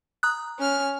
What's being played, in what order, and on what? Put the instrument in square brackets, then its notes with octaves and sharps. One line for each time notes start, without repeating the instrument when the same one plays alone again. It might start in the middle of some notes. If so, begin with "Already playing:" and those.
[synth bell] A#5 D#6 F#6
[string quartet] C#4 F6